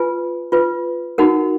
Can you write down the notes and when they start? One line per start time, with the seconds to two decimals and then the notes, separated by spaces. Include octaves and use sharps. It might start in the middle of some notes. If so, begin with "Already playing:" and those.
Already playing: F4 B4 G#5
0.52 F4 B4
1.18 D#4 F#4 A#4 F#5